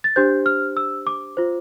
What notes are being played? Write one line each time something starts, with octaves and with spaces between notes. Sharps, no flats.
A6
D4 G4 C5 G6
F6
E6
D6
F4 C5